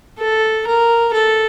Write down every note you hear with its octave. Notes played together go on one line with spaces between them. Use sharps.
A4
A#4
A4